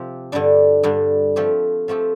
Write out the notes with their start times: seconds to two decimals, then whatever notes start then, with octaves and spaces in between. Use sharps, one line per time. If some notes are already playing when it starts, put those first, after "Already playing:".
Already playing: C3 F3 C4 G4
0.32 G2 D3 G3 D4
0.83 G2 D3 G3 D4
1.36 F3 A3 C4 G4
1.88 F3 A3 C4 G4